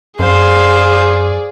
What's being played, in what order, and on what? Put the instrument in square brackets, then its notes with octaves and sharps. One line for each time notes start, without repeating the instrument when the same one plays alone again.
[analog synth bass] F#2 [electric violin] G#4 D5 [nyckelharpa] C5 F5